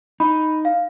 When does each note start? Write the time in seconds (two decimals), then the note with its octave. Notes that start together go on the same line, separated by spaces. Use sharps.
0.20 D#4 B5
0.65 F5